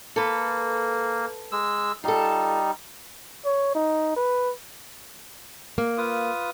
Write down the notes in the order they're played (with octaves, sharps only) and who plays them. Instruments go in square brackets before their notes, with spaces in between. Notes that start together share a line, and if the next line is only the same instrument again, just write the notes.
[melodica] A#3 [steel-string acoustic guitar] A4 B4
[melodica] G#3 E6
[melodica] G3 D#4 [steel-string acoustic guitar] F4 A4
[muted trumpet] C#5
D#4
B4
[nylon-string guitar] A#3
[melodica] F4 B4 D#6